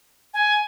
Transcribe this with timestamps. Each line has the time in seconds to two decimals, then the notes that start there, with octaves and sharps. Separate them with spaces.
0.34 G#5